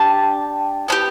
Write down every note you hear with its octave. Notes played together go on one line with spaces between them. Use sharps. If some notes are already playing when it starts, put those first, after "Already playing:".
Already playing: D4 G4 A5
B3 D4 G4